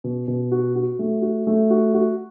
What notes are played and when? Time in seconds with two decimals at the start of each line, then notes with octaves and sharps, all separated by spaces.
0.04 B2
0.28 B2
0.52 F#4
0.76 F#4
0.99 A3
1.22 F#4
1.47 A3
1.70 F#4
1.94 F#4